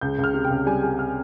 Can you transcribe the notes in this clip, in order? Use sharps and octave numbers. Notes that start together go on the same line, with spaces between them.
C#2 G6
C#2
F6
C3
G5
C#2
G3 G#5
G3 G#5
F6